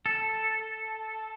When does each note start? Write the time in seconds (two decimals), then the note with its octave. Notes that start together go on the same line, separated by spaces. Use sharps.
0.06 A4